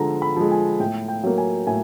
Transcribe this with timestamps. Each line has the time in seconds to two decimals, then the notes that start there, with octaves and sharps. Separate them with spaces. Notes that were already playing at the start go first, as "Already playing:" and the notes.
Already playing: D3 F3 G#3 A#5
0.22 B5
0.36 F3 G#3
0.52 G#5
0.80 A2 G5
1.08 G5
1.23 F#3 A#3
1.38 G#5
1.67 A2 G#5